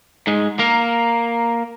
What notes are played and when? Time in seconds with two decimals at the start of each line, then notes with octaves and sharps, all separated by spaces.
0.27 G#2 G#3
0.59 A#3 A#4